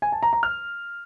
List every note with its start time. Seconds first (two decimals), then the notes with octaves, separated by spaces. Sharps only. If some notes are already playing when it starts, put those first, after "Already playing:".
0.02 G#5
0.12 A5
0.23 A#5
0.33 A#5
0.43 F6